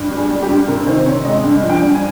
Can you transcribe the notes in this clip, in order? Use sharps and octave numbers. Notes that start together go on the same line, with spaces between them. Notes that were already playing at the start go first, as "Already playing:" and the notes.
Already playing: G2
G3
G#4
G3
G4
G2
C3 A#4
D#3 C5
C3 C#5
G#3 D#5
G2
F3
G5
G2
G#5